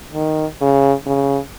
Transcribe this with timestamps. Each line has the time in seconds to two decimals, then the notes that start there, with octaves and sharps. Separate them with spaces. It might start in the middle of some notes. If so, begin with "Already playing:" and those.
0.14 D#3
0.61 C#3
1.06 C#3